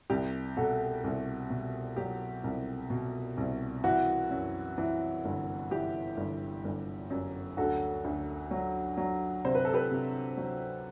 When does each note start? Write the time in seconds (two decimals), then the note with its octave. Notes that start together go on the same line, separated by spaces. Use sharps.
0.10 C2 G4
0.57 B2 F#4 A4
1.04 C2
1.50 B2
1.97 F#3 G4
2.44 C2
2.90 B2
3.37 C2
3.84 E3 F#4
4.31 F#2
4.78 E3
5.25 G1
5.71 E3 G4
6.17 G1
6.64 G1
7.10 F#2
7.57 D2 F#4 A4
8.04 D2
8.51 F#3
8.97 F#3
9.45 C3 C5
9.55 B4
9.65 A4
9.74 G4 B4
9.91 C3
10.37 F#3